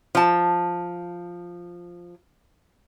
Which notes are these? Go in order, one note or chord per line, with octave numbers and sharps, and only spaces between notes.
F3 A5